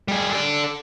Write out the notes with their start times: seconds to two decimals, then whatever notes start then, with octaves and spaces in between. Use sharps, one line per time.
0.08 G3 G#4
0.32 A4 D5